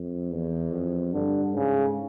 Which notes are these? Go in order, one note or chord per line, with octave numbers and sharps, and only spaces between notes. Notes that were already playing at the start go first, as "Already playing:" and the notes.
Already playing: F2
E2
F2
G2 D3
G#2 C#3